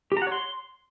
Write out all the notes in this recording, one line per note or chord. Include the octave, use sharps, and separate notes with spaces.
G4
A#5
F#5
C#5
C6